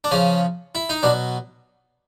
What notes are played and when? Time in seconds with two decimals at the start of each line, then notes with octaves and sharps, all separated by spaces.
0.04 D4
0.11 C#3 F3 C#4
0.75 E4
0.89 D#4
1.03 B2 F#3 D4